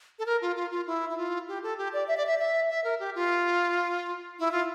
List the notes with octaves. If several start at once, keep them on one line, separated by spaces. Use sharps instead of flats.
A4
A#4
F4
F4
F4
E4
E4
F4
G4
A4
G4
D5
E5
D5
E5
E5
E5
A#4
G4
F4
E4
F4